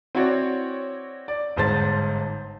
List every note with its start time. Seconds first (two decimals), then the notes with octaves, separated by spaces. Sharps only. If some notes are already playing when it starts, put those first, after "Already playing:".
0.15 C4 E4 F#4 C#5 D5
1.28 D5
1.56 G1 G#2 C5 A5 A6